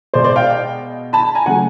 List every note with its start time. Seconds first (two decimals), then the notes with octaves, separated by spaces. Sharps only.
0.14 B2 G#3 C5 D5
0.24 C5 D5
0.36 F5 G5
1.13 A5 B5
1.35 G#5 A#5
1.46 C#3 F#3 A3 F#5 G#5